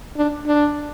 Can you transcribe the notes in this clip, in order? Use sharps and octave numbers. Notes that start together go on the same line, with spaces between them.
D4
D4